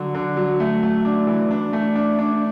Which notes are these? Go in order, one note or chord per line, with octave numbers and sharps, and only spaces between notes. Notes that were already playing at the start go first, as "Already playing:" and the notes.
Already playing: D3 F#3 F#4
D3
F#3
A3
A3
D4
E3
D4
A3
D4
D4